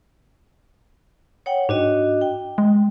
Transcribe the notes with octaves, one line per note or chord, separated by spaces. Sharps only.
C#5 F#5 G5
G#2 D4 F#4 D#5
G5
G#3